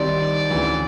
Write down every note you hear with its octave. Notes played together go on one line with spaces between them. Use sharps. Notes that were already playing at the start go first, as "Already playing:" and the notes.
Already playing: C2 C3 D#3 G3 C4 D5
D2 C#3 E3